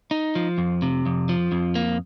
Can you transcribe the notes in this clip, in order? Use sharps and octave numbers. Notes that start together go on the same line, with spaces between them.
D#4
F3
F2
C3
F2
F3
F2
A#3